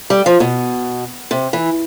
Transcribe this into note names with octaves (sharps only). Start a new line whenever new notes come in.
G3
F3
B2
C3
E3